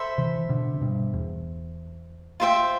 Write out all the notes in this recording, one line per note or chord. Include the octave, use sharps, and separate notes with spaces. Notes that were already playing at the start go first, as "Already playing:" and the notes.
Already playing: A4 C5 E5 B5
C3 E3
B2 D3
C3
G2 B2
E2
F4 C5 E5 G5